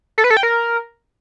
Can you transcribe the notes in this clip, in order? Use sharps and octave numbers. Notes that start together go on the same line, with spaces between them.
A4
B4
A4
G5
A#4